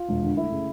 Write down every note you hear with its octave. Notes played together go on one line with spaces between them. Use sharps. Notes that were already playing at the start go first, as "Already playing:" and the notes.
Already playing: F4
E1
D3
A3 E4
C#3